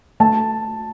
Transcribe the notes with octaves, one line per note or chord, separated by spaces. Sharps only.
A3 A5